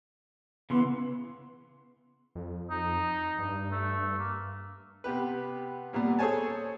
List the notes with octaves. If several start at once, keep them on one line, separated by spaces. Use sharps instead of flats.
C#3 E3 B3 C6
F2
D#4
G2
A3
A#3
C3 B3 G4 B4
D#2 A#2 G3 B3
G#4 A4 C5 C#5 G#5 A5